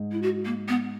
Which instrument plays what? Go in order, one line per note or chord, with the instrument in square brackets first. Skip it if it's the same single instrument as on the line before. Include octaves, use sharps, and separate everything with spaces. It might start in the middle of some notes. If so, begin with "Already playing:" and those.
Already playing: [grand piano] G#2
[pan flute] E4
F#4
A#3
B3